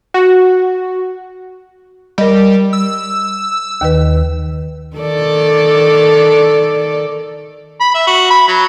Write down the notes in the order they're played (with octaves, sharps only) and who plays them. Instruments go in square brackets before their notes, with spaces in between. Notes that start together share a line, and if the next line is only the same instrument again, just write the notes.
[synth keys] F#4
[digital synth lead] G3 [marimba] A#4 D#5
[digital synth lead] E6
[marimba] D#2 D#3 B4
[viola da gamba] D#3 A4 D5
[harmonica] B5
E5
F#4
B5
F#3